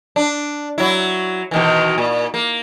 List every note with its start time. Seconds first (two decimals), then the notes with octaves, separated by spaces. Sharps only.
0.16 D4
0.78 F#3 E4
1.51 B2 D#3 E3
1.98 A#2
2.34 A#3